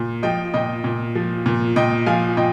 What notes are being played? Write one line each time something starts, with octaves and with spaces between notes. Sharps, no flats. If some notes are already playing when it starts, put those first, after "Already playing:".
Already playing: A#2
F3 D#5 G5
A#2 D#5 G5
A#2
F3
A#2
A#2 D#5 G5
F3 F5 G#5
A#2 D#5 G5